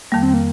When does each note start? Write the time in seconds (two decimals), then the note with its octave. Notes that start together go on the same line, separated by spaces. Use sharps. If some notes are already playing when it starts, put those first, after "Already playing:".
0.12 F2 D#3 G3 A#3
0.23 C4
0.34 A#3